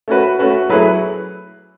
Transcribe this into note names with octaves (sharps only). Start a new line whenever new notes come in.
A3 C#4 F#4 B4
A3 C#4 F#4 B4
F#3 A3 E4 G#4 B4